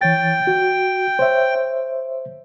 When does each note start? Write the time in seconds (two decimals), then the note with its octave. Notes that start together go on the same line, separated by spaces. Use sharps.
0.01 E3 C#5 G5 A6
0.47 F#4
1.19 C5 C#5 E5